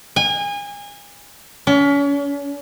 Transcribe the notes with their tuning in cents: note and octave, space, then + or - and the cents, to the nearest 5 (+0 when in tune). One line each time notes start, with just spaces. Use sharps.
G#5 -30
C#4 +35